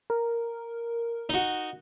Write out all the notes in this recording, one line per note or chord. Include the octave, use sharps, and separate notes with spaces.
A#4
D#4 F#4